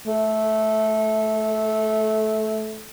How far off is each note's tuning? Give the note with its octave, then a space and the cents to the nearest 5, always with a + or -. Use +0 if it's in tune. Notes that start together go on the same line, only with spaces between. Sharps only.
A3 -15